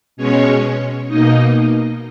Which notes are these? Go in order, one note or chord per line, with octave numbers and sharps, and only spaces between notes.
B2 G#3 C#4 C#5
B2 A#3 D#4 D#5